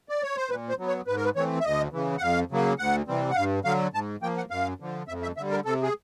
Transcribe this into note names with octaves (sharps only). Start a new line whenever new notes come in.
D5
C#5
C5
A#2 B4
C5
F#3 B3
C#5
G#2 B4
A#4
B4
E3 A3 C4 C#5
E5
D2 D#5
C#3 E3
F#5
F2 F5
C#3 F#3 A#3
D2 F#5
C3 E3 G3 C4
F#5
G2 F5
D3 F#3 F5
G#2 A5
F3 A#3 G5
F#5
F#2 F5
D3 F3
F2 E5
E5
D3 G3 E5
A#4
C3 A4
G#4